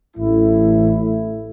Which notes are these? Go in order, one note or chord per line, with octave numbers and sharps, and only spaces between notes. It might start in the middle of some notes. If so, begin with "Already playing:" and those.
A1 A2 A3 E4